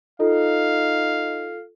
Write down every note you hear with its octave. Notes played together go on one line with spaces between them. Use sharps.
D#4 F4 A4 F5